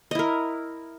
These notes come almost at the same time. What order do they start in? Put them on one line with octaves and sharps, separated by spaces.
D#5 E4 A#4